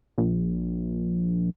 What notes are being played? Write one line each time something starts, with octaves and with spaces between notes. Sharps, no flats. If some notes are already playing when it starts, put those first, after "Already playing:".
A#1